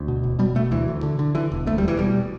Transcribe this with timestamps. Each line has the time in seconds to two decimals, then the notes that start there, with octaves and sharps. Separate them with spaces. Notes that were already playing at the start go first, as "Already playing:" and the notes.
Already playing: D2
0.08 B2
0.23 E1
0.39 B2 G3
0.55 B2 A3
0.71 D2 E3
0.88 D2
1.03 D3
1.19 D3
1.35 D3 E3
1.52 E1
1.66 D2 A3
1.78 G3
1.83 E1 E3
1.99 B2 G3